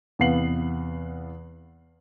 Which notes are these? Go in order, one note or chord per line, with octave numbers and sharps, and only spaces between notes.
E2 C3 B3 F5 C7 F#7